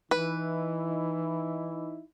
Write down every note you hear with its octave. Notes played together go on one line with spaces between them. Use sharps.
E3 D#4 E4 B4